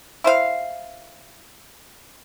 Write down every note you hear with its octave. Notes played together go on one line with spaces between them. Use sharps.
E4 C5 F5